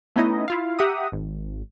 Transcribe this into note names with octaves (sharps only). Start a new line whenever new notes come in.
A3 B3 C#4 D#4 E4 D#5
E4 F4 F5
G4 E5 F#5 A#5 D#6
G#1